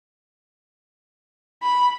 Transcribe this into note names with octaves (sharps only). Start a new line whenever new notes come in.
B5